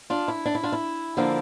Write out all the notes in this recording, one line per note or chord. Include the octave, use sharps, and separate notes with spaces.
D4 F4
E4
D4
E4
D4 F4
E4
D3 F3 A#3 D4